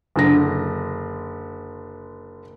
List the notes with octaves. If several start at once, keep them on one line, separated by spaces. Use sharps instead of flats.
F#1 D3 A#6